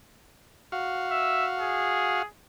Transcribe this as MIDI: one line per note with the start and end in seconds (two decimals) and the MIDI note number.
0.72 2.22 66
0.72 2.22 77
1.11 1.46 76
1.58 2.27 68